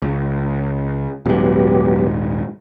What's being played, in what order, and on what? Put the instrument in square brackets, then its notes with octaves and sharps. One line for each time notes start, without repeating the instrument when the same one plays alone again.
[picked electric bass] C#2
[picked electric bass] D#1 G#2 [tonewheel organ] F#3 B3 G4